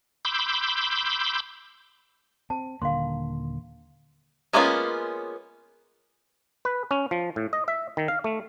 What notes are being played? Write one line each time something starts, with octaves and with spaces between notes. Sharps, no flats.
B5 C6 D6 E6 G6
C4 A5
D#1 D3 A#3 F5 C6
G#3 A#3 B3 C#4 F4
B4
C#4
F3
A2
D#5
E5
D#3
F5
A3